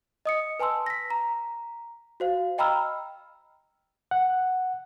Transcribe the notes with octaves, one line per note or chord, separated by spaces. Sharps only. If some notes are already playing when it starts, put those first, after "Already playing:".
D#5 D#6 C#7
B4 G#5 A5 C6 E6
A#6 B6
A#5
F#4 C5 F5
D#5 G5 A#5 B5 E6 F6
F#5